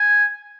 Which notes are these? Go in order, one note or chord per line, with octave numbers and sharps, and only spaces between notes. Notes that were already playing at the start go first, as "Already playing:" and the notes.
Already playing: G#5